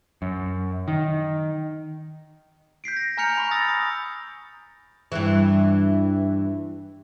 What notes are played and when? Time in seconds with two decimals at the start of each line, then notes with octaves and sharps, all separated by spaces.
0.22 F#2
0.88 D#3
2.84 G6 B6 C7 D7
2.96 A#6
3.17 G#5 A#5 F6 G6 C#7 F7
3.38 B5 C#6
3.51 D#6 E6 A6 A#6
3.68 D#6
5.12 G2 E3